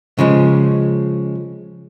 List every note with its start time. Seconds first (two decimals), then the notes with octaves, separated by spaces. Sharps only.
0.19 C#3 F3 G#3